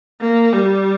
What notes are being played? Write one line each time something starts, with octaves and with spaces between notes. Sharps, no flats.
A#3
G3